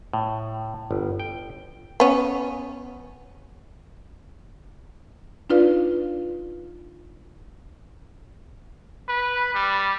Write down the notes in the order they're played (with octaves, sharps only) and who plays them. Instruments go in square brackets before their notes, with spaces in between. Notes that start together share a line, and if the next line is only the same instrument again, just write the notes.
[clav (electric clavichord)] A2
G1
G5
[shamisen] B3 C#4
[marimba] D4 D#4 F4 B4 D5 F5
[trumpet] B4
G3